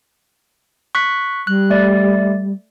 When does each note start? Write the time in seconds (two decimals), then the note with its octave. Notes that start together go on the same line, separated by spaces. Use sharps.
0.95 C#6 F#6 B6
1.47 G3 F#6
1.70 A3 D5